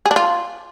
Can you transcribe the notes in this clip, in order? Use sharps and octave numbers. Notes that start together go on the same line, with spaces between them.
G#4
D4
F4